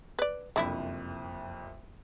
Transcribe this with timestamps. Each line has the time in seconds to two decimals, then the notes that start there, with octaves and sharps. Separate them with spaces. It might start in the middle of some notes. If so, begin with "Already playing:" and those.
0.19 B4 D5
0.56 F#1 C2 F2 D3 E4 E5